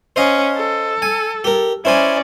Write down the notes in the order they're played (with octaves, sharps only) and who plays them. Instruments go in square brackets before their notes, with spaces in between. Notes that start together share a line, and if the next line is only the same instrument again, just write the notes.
[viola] C#4 [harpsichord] C5 D#5 F5
[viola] A4
[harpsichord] G#5
G4 A#4
[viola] C#4 D5 [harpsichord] E4 C5 G#5